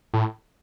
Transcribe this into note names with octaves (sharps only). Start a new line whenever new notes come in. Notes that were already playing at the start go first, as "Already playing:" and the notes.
A2